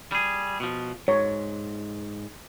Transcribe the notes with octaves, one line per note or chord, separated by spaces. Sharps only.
G3 G#4
B2 F3
G#2 C#5